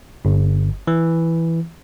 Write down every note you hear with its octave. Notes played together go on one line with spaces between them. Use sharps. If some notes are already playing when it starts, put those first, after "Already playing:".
G1
E3